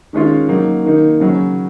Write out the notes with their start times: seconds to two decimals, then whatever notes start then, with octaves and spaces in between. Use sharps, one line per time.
0.13 D#3 G#3 C#4 F4
0.49 F#3 A#3 D#4
0.85 D#3 A#3 D#4
1.20 C#3 F#3 C#4